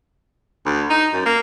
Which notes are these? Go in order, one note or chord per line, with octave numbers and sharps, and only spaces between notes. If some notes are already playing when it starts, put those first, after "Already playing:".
D2
D#4
F#2
A#3